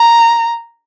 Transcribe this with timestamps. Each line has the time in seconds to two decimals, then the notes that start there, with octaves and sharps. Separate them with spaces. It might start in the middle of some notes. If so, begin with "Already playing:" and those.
Already playing: A#5